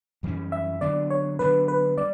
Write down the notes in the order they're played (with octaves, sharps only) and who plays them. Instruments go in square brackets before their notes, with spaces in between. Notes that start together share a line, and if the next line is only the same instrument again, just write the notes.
[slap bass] F#2 E3 G3 C#4
[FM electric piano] E5
[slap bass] D3 F#3 B3 D4 [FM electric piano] D5
[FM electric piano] C#5
[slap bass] D3 F#3 B3 D4 [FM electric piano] B4
[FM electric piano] B4
[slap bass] G3 [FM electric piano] D5